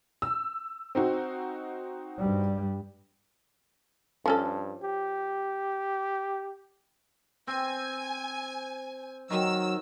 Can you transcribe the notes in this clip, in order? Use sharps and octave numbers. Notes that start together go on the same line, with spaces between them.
E6
C4 D#4 F#4
G2 G3
G2 F3 C#4 A4
G4
C4 G#5
D#3 F#3 E6